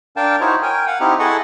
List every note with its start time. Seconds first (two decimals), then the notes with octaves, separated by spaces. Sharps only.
0.17 D4 A#4 F5 G5 A5
0.41 D#4 E4 F#4 C5 C#5
0.63 A#4 G5 G#5
0.87 F5 F#5
1.00 C4 D#4 E4 G4
1.19 E4 G#4 A4 D#5 F#5 C#6